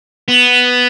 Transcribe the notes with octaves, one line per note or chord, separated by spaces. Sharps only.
B3